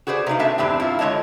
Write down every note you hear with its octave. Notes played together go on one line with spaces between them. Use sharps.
F#4 G#4 B4 C5 D5
C3 A3 D#4 F5
A3 D4 E5 A5
E2 G2 C4 D4 G4
E4 F4
D3 G#3 C#5 D#5 A5